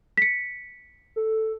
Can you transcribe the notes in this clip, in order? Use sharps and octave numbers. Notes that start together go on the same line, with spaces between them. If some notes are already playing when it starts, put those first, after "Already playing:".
B6 C#7
A4